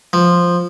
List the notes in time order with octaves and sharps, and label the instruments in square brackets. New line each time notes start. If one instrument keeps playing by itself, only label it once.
[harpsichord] F3